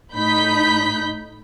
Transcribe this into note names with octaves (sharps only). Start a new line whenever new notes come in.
A2 D#4 B5 G6 B6